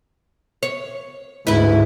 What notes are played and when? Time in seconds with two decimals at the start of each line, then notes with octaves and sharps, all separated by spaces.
0.63 C#5
1.47 A1 D2 G#2 E4 B4